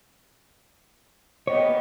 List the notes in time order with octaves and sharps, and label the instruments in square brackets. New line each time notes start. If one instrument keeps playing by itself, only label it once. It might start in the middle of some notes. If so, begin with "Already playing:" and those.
[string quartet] A#3 B3 G4 [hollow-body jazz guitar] C#5 [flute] D#5